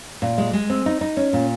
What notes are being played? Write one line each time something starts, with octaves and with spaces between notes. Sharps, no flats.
A#2
G#3
G#3
C4
D#4
D#4
C#4
A#2